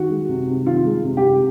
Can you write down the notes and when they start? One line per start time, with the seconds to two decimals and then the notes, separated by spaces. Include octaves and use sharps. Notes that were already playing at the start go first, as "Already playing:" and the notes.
Already playing: D#3 F#4
0.10 G#3
0.29 C3
0.47 C3
0.66 D#3 F4
0.85 G#3
1.04 C3
1.17 G4
1.23 C3